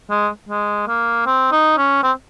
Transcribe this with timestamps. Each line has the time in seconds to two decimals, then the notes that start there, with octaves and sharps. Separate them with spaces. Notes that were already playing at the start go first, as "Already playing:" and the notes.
0.10 G#3
0.49 G#3
0.87 A#3
1.26 C4
1.52 D#4
1.78 C#4
2.03 C4